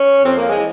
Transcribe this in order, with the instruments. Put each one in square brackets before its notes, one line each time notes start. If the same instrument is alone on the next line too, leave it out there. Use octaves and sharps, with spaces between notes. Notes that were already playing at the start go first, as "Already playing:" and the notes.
Already playing: [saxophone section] C#4
F2 C4
A#3
G#3
E3